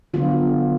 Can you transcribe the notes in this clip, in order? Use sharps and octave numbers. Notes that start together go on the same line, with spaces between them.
D3 F#3 B3 F4